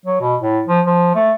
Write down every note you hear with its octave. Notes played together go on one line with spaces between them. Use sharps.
F#3
B2
A2
F3
F3
A3